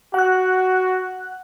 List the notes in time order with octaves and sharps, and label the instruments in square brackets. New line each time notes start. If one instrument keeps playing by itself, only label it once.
[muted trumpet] F#4 [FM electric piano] F#5 F#6